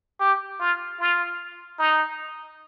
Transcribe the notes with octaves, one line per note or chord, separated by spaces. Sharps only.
G4
F4
F4
D#4